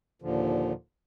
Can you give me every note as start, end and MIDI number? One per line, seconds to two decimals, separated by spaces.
0.22 0.73 39
0.22 0.73 46
0.22 0.73 50
0.22 0.73 53